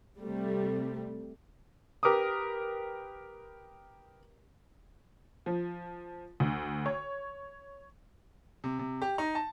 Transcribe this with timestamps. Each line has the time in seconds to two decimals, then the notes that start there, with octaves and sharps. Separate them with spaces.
0.19 C3 G3 A3
2.03 G4 A#4 B4 D6 D#6
5.46 F3
6.40 D2
6.86 C#5
8.64 C3
8.79 C3
9.02 G4
9.18 D#4
9.35 A5